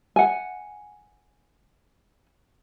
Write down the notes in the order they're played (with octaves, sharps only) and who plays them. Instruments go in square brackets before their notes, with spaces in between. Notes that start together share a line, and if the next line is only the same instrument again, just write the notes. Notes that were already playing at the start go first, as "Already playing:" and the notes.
[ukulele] F#5 G#5